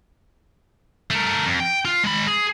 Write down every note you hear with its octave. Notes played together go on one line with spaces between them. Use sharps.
A3 A#4
F2
G5
F4
G#3 B5
G#4